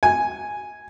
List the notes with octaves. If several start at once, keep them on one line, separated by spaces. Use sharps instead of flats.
G#5